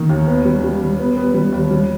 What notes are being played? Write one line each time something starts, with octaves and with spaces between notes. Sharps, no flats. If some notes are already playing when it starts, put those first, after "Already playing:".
Already playing: D#3 A#3
D#2
B3
G3
G3
G3
B3
B3
G3
D#2
G3